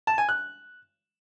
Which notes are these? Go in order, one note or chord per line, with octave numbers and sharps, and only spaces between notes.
A5
G#5
F#6